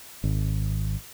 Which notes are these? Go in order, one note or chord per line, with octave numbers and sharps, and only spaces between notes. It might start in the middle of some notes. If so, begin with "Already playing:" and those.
G#1